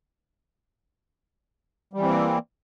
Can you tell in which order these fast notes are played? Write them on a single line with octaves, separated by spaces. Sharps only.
G3 E3 C4 A#3